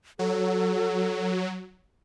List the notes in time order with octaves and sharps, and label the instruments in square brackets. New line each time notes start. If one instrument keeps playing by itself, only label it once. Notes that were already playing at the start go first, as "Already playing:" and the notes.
[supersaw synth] F#3 [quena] A4